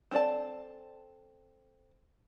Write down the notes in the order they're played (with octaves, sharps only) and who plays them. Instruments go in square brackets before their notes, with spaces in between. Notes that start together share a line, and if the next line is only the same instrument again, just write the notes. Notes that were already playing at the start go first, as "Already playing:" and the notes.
[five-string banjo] C4 D#4 A4 D5 A5